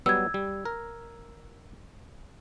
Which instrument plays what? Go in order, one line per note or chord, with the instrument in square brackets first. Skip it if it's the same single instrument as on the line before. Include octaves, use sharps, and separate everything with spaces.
[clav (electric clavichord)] F#3 G3 B3 [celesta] E6 G#6
[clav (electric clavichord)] G3
A#4